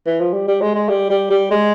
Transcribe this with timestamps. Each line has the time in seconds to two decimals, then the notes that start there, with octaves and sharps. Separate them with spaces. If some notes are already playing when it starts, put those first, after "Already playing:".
0.07 E3
0.20 F3
0.34 G3
0.48 G3
0.61 G#3
0.75 G#3
0.89 G3
1.10 G3
1.30 G3
1.51 G#3